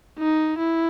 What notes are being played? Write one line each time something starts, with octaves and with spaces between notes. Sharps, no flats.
D#4
E4